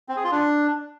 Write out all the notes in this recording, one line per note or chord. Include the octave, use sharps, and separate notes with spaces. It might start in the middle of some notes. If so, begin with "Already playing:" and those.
C4
G#4
F4
D4